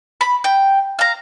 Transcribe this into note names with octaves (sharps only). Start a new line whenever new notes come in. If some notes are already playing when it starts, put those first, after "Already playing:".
B5
G5
F5 A#5